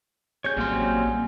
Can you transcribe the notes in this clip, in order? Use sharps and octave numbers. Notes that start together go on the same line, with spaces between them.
C#4 G4 G#4 C#5 G6
A1 F#3 G3 A#3 C4 C6 F6